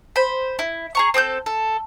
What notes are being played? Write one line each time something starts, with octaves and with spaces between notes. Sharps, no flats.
C5 B5
E4
G#4 A#5 C#6
C4 A4 D#6 G6
A4